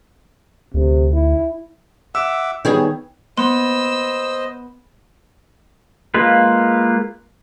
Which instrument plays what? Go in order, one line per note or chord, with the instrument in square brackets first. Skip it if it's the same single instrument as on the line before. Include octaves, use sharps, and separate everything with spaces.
[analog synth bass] D2 [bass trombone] C3
[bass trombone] E4
[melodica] E5 F#5 D6 [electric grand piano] E6
[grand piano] D#3 B3 D#4 [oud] G3 G#4 [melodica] C#5
[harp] B3 [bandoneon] C5 D#5 [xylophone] C6 [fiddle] E6
[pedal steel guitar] G#3 A#3 F4 B4